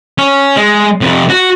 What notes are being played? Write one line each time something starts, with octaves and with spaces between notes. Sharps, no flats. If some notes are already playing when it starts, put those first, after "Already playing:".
C#4
G#3
F2 C3
F#4